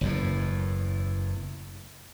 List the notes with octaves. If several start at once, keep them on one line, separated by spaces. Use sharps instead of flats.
F#1 E2 A2